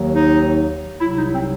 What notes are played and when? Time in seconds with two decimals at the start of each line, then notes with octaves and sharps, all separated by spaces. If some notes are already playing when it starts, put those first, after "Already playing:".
Already playing: D#2 D#3 F#3
0.13 D#4
1.00 C2 C3 F#3 E4
1.16 D#4
1.33 C4